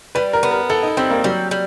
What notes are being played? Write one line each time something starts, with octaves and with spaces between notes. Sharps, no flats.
G3 B4
A#4
B3
A#4
E4 A4
D#4
G3 C4
A#3
F#3 G3
G3